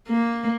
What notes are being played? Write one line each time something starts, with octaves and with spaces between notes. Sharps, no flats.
A#3